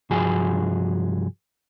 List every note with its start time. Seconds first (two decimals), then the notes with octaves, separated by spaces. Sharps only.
0.10 C2 G2 F3 F#4 G#4 G#5